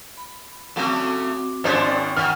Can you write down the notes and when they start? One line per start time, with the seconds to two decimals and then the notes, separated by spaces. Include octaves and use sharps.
0.17 B5
0.76 C#3 F#3 A3 C4 F#4 D6
1.64 G#1 G#3 C#4 D4 C5 F5 C6
1.88 G5 C#6
2.17 D#3 F#5 G#5 F6